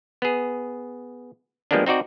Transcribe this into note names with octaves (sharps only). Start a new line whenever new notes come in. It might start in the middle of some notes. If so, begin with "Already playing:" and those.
B3 G#4
F3 G3 G#3 A#3 B3 D4
C4 D#4 F#4 D5